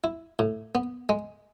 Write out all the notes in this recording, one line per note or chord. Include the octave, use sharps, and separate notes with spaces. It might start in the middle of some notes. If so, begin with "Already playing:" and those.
E4
A2
B3
G#3